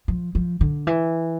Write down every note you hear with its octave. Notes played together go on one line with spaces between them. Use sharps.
F3
F3
D3
E3